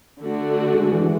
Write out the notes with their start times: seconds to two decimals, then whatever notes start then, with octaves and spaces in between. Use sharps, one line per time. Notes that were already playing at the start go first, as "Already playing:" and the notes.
0.20 D3 A3 D4 F#4
0.73 G#3
0.92 E3